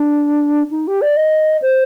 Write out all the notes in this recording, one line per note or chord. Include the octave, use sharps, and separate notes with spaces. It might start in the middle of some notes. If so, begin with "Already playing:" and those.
Already playing: D4
D#4
G4
D5
D#5
C5